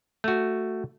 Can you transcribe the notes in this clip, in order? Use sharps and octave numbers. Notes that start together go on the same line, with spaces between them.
A3 F#4